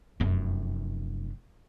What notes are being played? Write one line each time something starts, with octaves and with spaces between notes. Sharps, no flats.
F1 F#2